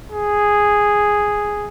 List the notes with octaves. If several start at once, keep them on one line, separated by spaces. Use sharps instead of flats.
G#4